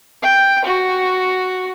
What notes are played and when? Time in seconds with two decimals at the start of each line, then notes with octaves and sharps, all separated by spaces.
0.22 G5
0.64 F#4